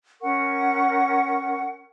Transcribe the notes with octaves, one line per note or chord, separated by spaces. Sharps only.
C#4 A#4 F#5 C#6